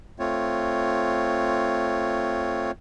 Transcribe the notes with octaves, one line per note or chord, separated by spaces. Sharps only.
A3 C4 F4 C#5